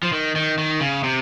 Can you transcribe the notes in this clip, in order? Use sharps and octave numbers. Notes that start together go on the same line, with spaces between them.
F3
D#3
D#3
D#3
C#3
C3